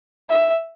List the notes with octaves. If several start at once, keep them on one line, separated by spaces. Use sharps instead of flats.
E5